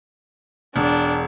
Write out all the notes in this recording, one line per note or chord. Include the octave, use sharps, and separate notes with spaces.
E1 D4